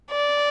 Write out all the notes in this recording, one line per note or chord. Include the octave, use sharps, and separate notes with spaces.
D5